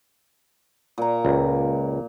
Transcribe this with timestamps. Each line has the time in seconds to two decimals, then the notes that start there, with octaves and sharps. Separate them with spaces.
0.98 A#2 A#5
1.25 C#2